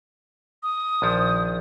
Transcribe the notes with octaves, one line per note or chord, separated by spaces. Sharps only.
D#6
A#1 D#3 F3